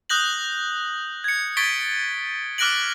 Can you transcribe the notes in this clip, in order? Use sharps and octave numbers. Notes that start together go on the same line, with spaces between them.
D#6 F#6 G6 A#6 F#7
G#6 C#7
C#6 G#6 A6 B6 D7 G7
D6 F6 F#6 A#6 D7 F#7